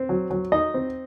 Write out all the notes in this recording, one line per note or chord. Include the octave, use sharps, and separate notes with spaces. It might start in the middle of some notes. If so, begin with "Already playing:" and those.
Already playing: C4
F#3
F#3
D#4 D#5
C4